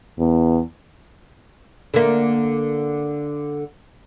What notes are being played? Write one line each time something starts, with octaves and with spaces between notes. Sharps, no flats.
E2
D3 A#3